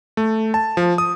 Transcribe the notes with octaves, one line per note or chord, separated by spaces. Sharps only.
A3
A5
F3
D#6